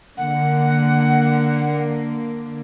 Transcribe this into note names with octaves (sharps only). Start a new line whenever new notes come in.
D3 A#3 F#5